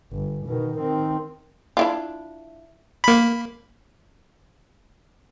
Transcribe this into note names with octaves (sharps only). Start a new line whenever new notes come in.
G1
B2 D#3
D#3 C4
D4 E4 F4
A#3 B5